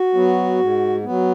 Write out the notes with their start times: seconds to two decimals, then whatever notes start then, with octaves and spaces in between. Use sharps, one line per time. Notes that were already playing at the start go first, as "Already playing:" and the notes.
Already playing: F#4
0.14 F#3 B3
0.59 G#2
1.05 F#3 B3